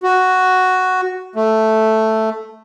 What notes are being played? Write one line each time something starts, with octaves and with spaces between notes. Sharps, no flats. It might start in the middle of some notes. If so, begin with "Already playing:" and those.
F#4
A3